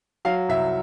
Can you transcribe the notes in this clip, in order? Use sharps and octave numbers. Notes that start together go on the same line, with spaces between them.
F#3 F5
C2 E5